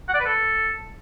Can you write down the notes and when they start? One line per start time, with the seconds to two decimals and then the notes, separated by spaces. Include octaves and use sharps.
0.08 F#5
0.14 D5
0.20 B4
0.25 A4